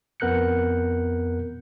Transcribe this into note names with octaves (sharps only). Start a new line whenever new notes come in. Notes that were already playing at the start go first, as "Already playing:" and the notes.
F2 B3 A#4 F#6 G6 C#7